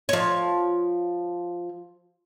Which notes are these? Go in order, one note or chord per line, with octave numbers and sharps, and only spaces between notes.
F3 C#5